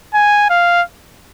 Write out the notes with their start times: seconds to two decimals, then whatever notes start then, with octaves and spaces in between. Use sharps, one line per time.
0.14 G#5
0.50 F5